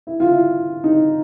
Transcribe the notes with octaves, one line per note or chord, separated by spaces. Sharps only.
E4
F4
E4
D#4